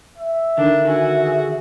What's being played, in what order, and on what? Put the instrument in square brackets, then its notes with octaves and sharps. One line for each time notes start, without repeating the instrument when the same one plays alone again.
[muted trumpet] E5
[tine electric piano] D3 D#3 [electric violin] D4
[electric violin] F#4 [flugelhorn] G#5
[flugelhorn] G#4